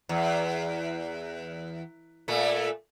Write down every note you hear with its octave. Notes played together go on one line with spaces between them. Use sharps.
E2
A#2 A3